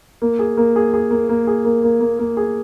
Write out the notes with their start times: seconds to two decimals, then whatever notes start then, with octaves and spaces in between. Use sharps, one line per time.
0.22 A#3
0.39 G#4
0.57 A#3
0.76 G#4
0.94 G#4
1.11 A#3
1.29 A#3
1.47 G#4
1.65 A#3
1.83 A#3
2.00 A#3
2.19 A#3
2.37 G#4